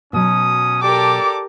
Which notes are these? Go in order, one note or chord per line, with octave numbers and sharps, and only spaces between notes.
B2 F#3 C#4 D#6
G4 A4 A#4 D5 A5 D6